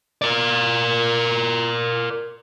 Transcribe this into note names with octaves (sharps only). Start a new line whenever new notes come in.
A#4 D5